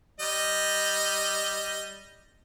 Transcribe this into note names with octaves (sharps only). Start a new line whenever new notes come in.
G3 D#5